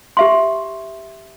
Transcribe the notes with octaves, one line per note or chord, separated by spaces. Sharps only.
G4 E5 C6